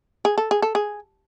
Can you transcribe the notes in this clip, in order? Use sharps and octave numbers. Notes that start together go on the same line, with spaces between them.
G#4
A4
G#4
A4
G#4